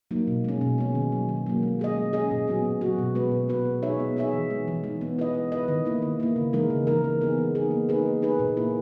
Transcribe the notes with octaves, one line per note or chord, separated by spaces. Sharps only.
F#3 A#3 D#4
B2
G#3 C#4
B2
G#3 C#4
D#3
F#3 A#3
D#3
F#3 A#3
G#3
C#4 G#4 D#5
G#3
C#4 G#4 D#5
A#2
F#3 B3 F#4
A#2
F#3 B3 F#4
B2
G#3 B3 F#4 B4
B2
G#3 B3 F#4 B4
B3
D#4 G#4 C#5 E5
B3
D#4 G#4 C#5 E5
E3
G#3 D#4
E3
G#3 D#4
B3
E4 B4 D#5
B3
E4 B4 D#5
D#3
A#3 E4
D#3
A#3 E4
C#3
E3 G#3 D#4 A#4
C#3
E3 G#3 D#4 A#4
E3
B3 D#4 G#4
E3
B3 D#4 G#4
A#3
D#4 G#4 B4
A#3
D#4 G#4 B4
A#2
A#3 E4